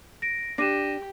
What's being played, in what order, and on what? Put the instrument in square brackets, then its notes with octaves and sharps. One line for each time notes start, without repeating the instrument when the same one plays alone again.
[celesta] A#6 D7
[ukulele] D4 [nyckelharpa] G4 [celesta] A#6 D#7 E7